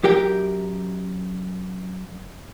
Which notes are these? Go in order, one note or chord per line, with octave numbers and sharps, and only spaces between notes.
F#2 G4 A#4 G5